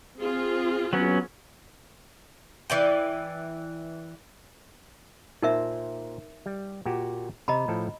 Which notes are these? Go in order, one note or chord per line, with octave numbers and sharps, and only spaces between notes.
C4 F4 G#4
F#3 B3 C#4
E3 D5 G5
A#2 D#4 A#4 C5 E5
G3
A#2 F#4 G4
C3 D#5 A#5 B5
A2 F3 A4